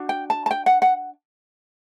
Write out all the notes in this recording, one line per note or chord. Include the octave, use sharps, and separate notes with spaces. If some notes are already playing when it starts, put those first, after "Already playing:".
Already playing: D4 F#4
G5
A5
A5
G5
F#5
F#5